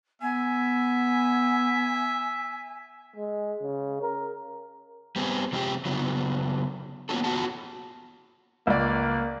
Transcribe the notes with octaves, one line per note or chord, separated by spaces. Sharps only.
B3 E5 G#5
G#3
C#3
A#4
G3 B3 C4 G#4
C3 F3 G#3 C4 F4 G4
C#3 F#3 B3 F4
A#3 B3 C#4 F4 F#4 A4
B3 F4 F#4 G#4 F#5 A5
C#2 A#3 D5